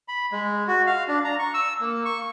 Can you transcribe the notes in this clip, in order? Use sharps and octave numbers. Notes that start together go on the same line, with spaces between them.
B5
G#3
F#4
F5
D4
A#5
C#6
E6
A#3
C#6